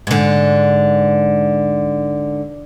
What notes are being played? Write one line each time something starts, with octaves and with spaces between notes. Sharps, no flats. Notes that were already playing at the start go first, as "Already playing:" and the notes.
G#2 D3